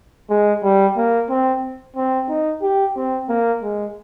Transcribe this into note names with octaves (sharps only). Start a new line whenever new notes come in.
G#3
G3
A#3
C4
C4
D#4
G4
C4
A#3
G#3